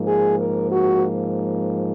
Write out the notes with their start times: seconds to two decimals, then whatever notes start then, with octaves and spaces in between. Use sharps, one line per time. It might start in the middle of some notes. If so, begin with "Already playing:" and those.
Already playing: G#2 F3 A#3
0.08 G#4
0.39 A#4
0.71 F#4